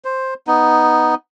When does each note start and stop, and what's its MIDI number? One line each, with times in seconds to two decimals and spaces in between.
0.05 0.34 72
0.47 1.15 59
0.47 1.15 63